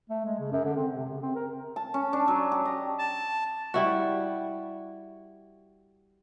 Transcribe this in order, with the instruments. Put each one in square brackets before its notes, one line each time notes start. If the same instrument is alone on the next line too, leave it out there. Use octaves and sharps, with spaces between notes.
[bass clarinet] A3
G#3
C#3
F#2
D3
C4
C3
C#3
C4
A#4
[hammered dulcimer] A5
C#4
D4
F#3
G4
D#5
[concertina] A5
[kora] G3 E4 F#4